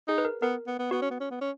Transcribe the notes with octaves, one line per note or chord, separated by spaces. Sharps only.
D#4 G#4
B4
A#4
B3 A#4
B3
B3
B3 F#4
C#4
B3
C#4
B3
C#4